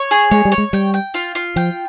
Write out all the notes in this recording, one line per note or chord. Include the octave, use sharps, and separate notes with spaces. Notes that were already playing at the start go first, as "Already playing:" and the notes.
Already playing: C#5
G#4
G#3 C#5
G3
C#5
G#3
G3 G5
G5
F4
F4
F3 G5